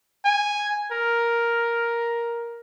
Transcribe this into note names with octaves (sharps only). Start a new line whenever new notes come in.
G#5
A#4